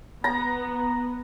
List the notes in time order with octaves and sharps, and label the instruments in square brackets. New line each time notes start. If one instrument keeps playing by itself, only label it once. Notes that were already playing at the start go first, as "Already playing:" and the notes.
[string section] B3 [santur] A#5